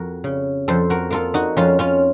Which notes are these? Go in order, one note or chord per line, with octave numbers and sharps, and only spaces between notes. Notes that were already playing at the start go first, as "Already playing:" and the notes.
Already playing: F2 F#4 A#4
C#3
F2 A4 C5
F#4 A#4
A#3 F4 A4
D#4 F#4
F2 C#4 F4
C#4 F4